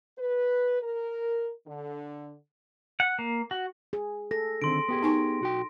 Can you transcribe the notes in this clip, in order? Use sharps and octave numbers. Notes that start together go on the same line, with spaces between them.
B4
A#4
D3
F#5
A#3
F#4
G#4
A4 A#6
D3 D#3 C4 C6 D7
B3 G4 G#4
D#4 G#5 C#6
B1 F#4 G5